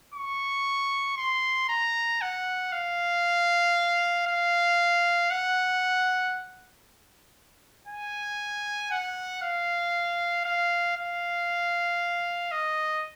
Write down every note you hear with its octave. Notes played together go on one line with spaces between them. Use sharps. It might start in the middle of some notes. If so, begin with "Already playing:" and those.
C#6
C6
A#5
F#5
F5
F5
F#5
G#5
F#5
F5
F5
F5
D#5